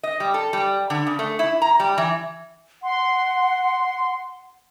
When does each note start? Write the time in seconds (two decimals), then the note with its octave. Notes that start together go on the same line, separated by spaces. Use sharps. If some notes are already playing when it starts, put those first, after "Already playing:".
0.03 D#5
0.20 G3
0.34 A4
0.53 G3
0.90 D3
1.07 C#3
1.19 A3
1.39 E4
1.62 A#5
1.80 G3
1.98 E3
2.83 F#5 C6